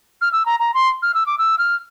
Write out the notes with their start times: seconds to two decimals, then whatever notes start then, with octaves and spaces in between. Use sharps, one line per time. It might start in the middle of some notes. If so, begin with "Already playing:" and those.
0.21 F6
0.32 E6
0.46 A#5
0.60 A#5
0.74 C6
1.02 F6
1.14 E6
1.26 D6
1.38 E6
1.58 F6